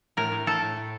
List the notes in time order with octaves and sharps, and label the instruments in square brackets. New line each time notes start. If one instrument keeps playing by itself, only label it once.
[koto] A2 A#4
A2
A2 A4
A2
A2